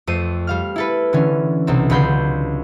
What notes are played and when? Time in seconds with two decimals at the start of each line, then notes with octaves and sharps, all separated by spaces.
0.07 F2 A3 C5 D#7
0.47 G3 F5 F6
0.76 E4 A4 B4
1.13 D3 E3 C#4
1.67 B1 C3 C4
1.90 C#2 D3 F#3 B5 C6 G6